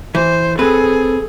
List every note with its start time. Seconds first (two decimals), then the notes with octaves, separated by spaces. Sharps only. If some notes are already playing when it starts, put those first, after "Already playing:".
0.15 E3 C5
0.59 C4 G#4 A4 B4